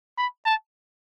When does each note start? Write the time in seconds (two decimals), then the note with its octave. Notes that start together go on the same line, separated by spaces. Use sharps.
0.18 B5
0.46 A5